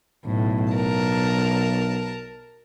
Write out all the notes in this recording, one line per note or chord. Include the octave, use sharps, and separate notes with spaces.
B1 A2
A#4 A5